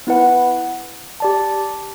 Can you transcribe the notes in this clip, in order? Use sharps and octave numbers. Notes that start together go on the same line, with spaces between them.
B3 E4 B4 F#5
G4 D5 A5